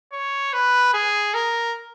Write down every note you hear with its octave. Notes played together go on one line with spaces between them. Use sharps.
C#5
B4
G#4
A#4